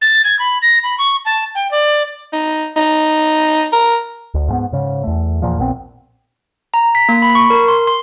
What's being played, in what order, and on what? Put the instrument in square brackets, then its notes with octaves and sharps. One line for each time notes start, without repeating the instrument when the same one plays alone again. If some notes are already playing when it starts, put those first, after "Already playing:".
[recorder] A6
G#6
B5
A#6
B5
C#6
A5
G5
D5
[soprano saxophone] D#4
D#4
A#4
[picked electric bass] D2
G#2 G#3 B3
G#2 C#3
E2 A3
E2 A#2 F3
A#1 A#2 B3 C4
[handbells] A#5
B6
A#3
B5
C#6
A#4
C6
C6